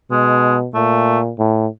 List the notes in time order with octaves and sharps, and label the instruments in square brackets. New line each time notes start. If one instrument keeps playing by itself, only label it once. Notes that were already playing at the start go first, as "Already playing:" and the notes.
[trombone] B2 [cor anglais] G#3
[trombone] A#2 [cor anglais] A3
[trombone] A2